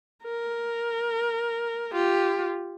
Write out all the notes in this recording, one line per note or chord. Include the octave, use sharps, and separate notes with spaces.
A#4
F4 G4